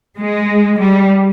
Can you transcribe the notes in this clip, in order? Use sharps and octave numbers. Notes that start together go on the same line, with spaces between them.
G#3
G3